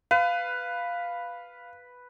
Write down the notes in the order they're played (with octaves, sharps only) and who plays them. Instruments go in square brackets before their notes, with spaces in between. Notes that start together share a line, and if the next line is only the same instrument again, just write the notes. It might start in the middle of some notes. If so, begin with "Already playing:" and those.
[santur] B4 [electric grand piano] F5